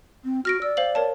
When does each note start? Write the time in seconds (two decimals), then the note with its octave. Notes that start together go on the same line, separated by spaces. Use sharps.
0.25 C4
0.45 F#4 F6 A#6 D7
0.62 D5 E6
0.77 C5 F5 F#7
0.95 A#4 C#5 A5